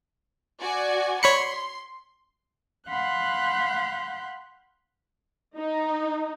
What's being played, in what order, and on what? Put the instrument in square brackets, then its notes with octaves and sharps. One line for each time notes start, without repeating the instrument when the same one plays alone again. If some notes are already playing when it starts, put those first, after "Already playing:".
[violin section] F#4 D5 G#5
[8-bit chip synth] C#5 B5 C#7 [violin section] C6
[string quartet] F5 F#5 B5 C6 F#6 G6
[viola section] D#4